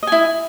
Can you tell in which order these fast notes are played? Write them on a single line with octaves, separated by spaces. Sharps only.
D#5 G#5 E4